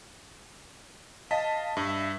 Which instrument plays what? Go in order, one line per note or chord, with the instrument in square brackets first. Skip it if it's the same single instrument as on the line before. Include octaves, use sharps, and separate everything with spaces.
[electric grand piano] D#5 A5 B6 [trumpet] F5
[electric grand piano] G2 [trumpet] E5